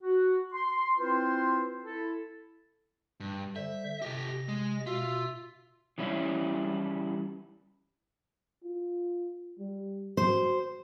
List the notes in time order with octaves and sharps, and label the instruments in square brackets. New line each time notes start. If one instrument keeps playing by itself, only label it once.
[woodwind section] F#4
C6
C4 E4 F4 B4 C5 C6
E4 A4
[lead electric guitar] G2
[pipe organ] D3 G3 C5 [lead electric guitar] E5
[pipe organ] C3 D#5 A#6 [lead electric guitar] G4 A4
[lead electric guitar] G#3
[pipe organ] B2 E5 E6 [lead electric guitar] F4
[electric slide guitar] E3 G3 C#4 E4
[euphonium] F4
G3
[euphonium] F#4 [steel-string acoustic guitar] C5